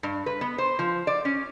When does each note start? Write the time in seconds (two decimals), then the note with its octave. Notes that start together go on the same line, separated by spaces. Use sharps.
0.03 G2
0.26 B4
0.41 B3
0.58 C5
0.79 F3
1.07 D5
1.25 C#4